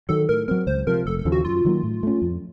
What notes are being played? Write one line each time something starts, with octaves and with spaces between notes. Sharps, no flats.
D#3 F#3 A4
A2 A#4
F#3 C4 A#4
C#2 C5
C3 F3 A#4
F1 A4
A4
D#2 C#3 F3
F#4
F#2 F4
D#3 F#3 A#3
A2
A3 C#4
F2